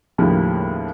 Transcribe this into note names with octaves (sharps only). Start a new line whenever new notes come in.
D#2 A2 C#3 F3 G3 A#3